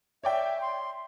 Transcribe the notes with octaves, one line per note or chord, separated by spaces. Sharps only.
C#5 D5 E5 G5
C6